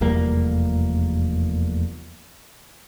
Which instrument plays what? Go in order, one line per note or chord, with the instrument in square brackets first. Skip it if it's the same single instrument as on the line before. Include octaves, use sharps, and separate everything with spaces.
[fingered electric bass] F1 E2 G3 A#3